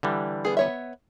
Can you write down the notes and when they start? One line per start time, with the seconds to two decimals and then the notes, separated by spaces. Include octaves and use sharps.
0.03 D3 E3 G3
0.45 B3 G#4
0.57 B3 C#5 E5